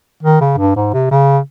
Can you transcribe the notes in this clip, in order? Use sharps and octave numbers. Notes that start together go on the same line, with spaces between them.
D#3
C#3
G2
G#2
C3
C#3